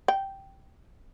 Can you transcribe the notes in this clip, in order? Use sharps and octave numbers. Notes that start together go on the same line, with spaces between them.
G5